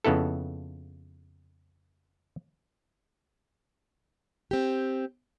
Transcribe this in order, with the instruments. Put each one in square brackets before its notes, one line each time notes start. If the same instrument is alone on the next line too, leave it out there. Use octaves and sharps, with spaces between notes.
[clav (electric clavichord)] F2 C#3 B3 E4 A4
[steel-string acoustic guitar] C4 G4